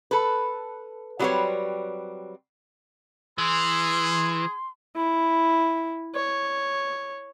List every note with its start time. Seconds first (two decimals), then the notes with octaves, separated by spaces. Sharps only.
0.11 A4 B4
1.19 F#3 G3 C4 F#4 B4 C#5
3.38 E3 G#4 C6
4.96 E4
6.15 C#5